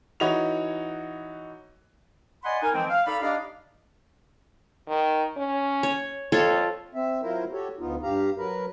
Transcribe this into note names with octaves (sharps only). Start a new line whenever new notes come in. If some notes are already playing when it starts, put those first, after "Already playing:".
E3 D#4 F#4 C#5 B5 F7
D5 D#5 F#5 G#5 B5 C6
D#4 A#4 G#5
E3 F3 G#3 C4
F5
D#4 A4 D5 F5 B5
D4 D#4 G4 D5 D#5 F5
D#3
C#4
C#5
F2 F4 A4 C#5
C4 E5
F#3 E4 F4 A#4 C5
F#4 G4 A4 C#5
D2 B3 D#4 F4
G2 G4 F5 A#5
F#3 A#4 B4